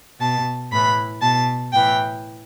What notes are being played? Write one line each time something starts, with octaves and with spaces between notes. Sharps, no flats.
B2 A5
A2 E3 B5
B2 A5
A2 E3 G5